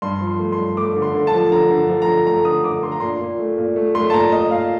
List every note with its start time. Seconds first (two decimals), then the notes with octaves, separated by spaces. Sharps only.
0.02 G2 C6
0.21 F3
0.27 C6
0.39 A3
0.52 C6
0.58 G2
0.77 A3 D6
0.96 D3
1.02 C6
1.14 D3
1.27 A5
1.34 F3
1.51 D3 A#5
1.70 D3
1.89 F3
2.02 A#5
2.08 D3
2.26 A3 A#5
2.45 D3 D#6
2.64 D3 D6
2.83 D3 C6
2.92 A#5
3.00 A#2 C6
3.20 A#2
3.39 A3
3.58 A#2
3.76 A3
3.95 A3 C6
4.10 A5
4.14 A#2 A#5
4.32 A#2 D#5
4.51 A#2 F5